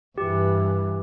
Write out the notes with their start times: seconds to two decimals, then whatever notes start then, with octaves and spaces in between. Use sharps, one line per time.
0.18 G2 E3 G4